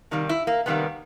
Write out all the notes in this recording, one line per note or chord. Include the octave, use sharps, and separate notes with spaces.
C3 D#3 G3 A#3
E4
A#3
C3 D#3 G3 A#3 B3